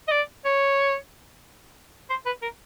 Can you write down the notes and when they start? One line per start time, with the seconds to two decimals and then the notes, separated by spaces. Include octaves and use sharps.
0.08 D#5
0.12 D5
0.45 C#5
2.10 C5
2.26 B4
2.42 A#4